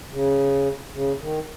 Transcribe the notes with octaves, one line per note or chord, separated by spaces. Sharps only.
C#3
C#3
D#3